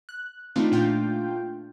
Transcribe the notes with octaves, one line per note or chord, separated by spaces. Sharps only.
F#6
E3 A3 C4 D4 D#4 F4
A#2 A3 D4 F4 G5 G6